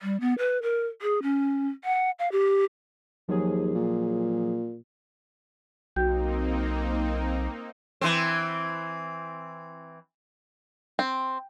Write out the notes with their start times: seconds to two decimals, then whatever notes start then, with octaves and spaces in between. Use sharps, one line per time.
0.02 G3
0.20 B3
0.38 B4
0.62 A#4
1.02 G#4
1.22 C#4
1.84 F#5
2.19 F5
2.32 G4
3.28 D#2 F3 F#3 G#4
3.75 A#2
5.96 B1 A#3 C4 D#4 F#4 G5 G6
8.01 E3 C4
10.99 C4